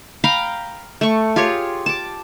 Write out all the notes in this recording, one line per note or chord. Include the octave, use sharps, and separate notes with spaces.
F5 G5 A#5 B5
A3 C#6
F4 G4 G#4 C#5
A5 D6